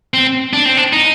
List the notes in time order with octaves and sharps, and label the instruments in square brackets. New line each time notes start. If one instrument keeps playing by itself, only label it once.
[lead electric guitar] C4
D4
C4
D4
D#4